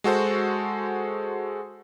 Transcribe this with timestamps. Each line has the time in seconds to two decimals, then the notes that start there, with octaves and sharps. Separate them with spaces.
0.04 G#3 F#4 A4 C5 F#5